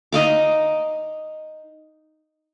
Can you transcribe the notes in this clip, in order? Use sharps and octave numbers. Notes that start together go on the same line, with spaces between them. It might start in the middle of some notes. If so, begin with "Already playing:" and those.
D#4 D#5 F5 D6